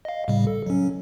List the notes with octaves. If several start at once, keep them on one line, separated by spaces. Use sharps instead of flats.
D#5 F5
A2 C#3 G3
A4
F#3 C#4